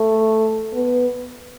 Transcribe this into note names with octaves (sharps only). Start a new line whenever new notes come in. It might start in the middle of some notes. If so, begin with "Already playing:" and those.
Already playing: A3
B3